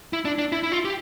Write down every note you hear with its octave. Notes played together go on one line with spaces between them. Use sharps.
E4
D4
D4
E4
E4
F4
G4